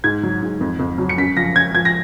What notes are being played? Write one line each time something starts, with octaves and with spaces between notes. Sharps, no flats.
G#2 G#6
F#3
G#2
F2
F2
F#3
C#7
F#2 B6
F3 A#6
F#2 G#6
F3 G#6
A#6